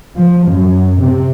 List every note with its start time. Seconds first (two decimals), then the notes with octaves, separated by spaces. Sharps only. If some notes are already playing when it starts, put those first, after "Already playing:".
0.16 F3
0.48 F#2
1.00 C3